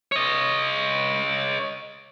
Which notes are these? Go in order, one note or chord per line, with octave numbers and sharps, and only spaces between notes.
C#5 D#5